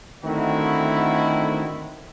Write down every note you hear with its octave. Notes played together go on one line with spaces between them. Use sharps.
D3 D#3 A3 C4 E4 F#4